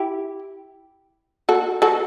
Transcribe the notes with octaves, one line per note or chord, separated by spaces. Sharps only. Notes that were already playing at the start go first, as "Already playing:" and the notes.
Already playing: E4 G4
F#4 A4
F#4 A4